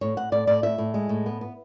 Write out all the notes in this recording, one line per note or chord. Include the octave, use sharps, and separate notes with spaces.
A2 C#5
A2 F#5
A2 D5
A2 D5
A2 E5
A2
G#3
A2
B3
B3